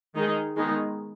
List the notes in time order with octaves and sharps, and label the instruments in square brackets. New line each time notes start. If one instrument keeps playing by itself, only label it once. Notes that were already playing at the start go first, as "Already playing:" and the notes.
[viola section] D#3 G#3 D#4 G#4
D#3 G#3 B3 D#4 G#4